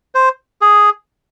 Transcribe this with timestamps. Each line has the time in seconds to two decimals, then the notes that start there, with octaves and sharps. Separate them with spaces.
0.15 C5
0.61 G#4